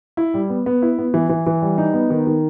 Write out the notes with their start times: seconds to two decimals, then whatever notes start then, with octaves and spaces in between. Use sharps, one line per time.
0.17 E4
0.34 G3
0.50 B3
0.66 B3
0.82 E4
0.98 B3
1.14 E3
1.29 E3
1.46 E3
1.62 G3
1.78 D#4
1.94 B3
2.10 D#3
2.27 D#3